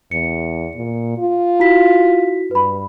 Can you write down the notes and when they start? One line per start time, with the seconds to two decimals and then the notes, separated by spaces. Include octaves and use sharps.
0.11 E2 C#7
0.76 A#2
1.18 F4
1.60 E4 F#4 B6
2.51 G2 B4 B5